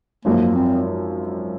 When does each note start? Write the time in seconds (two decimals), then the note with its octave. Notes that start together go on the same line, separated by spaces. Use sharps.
0.25 G#1 F#2 F3 A#3
0.55 C4